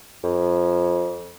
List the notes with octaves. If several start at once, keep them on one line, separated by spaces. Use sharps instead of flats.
F2